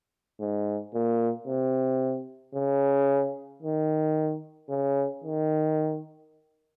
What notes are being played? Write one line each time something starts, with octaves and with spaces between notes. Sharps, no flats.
G#2
A#2
C3
C#3
D#3
C#3
D#3